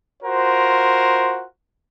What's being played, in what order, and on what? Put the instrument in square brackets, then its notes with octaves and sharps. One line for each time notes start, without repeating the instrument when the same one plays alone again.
[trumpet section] F4 F#4 A#4 C5